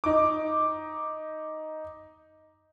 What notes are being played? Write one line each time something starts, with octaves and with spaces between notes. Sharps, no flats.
D#4 D6